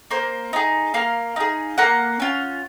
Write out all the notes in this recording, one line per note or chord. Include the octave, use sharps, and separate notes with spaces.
A#3 C5
D#4 G#4
A#3 F5
D#4 G#4
A#3 F#5
C#4 F4